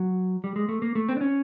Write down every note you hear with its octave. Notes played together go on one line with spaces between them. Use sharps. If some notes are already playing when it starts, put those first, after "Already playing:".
Already playing: F#3
G3
G#3
A3
A#3
A3
C4
D4
C#4